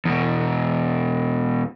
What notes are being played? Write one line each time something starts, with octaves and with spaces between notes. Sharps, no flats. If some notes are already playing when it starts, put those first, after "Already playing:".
E2 B2